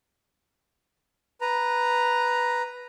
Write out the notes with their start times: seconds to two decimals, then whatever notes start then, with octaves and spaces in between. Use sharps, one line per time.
1.41 B4 A#5